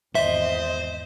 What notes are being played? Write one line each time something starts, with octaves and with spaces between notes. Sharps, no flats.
G#1 E2 C5 D#5 E5